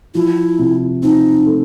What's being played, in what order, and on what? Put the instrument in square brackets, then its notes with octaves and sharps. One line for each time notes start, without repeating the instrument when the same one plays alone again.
[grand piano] F3 [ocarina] E4
[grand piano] C3
[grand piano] C4 [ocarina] D#4
[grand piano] A3